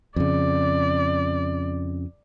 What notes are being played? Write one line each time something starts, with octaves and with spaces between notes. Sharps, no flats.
F2 C#3 D5